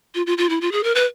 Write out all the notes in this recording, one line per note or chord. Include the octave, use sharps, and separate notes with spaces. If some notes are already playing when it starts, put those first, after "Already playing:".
F4
F4
F4
E4
F4
G#4
A#4
B4